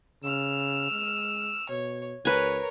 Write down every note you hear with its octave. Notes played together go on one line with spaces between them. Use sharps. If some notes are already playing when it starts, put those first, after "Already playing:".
C#3 E6 F6
G#3
B2 C#5
C#2 A#4 B4 C#5 G#5